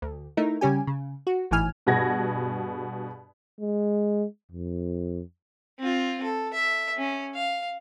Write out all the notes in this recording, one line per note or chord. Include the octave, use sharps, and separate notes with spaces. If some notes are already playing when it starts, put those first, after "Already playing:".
D2
A3 D#4 E4 A#4
C#3 G3 C#4 G4 G#5
C#3
F#4
G#1 A2 E3 G#5 F6
G2 B2 G#4 F#5 G#6 A#6
G#3
F2
C4 F4
A4
E5
C#4
F5